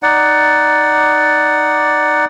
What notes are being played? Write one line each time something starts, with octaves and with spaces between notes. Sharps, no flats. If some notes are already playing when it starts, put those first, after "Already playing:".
D#4 D5 F#5